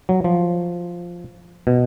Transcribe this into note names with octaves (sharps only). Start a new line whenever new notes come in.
F#3
F3
B2